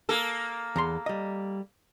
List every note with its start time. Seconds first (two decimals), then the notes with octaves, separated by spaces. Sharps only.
0.09 A#3 A4
0.76 E2 A#5 C6
1.06 G3 D#5